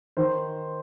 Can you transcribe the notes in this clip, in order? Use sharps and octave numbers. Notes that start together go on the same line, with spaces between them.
D#3 C5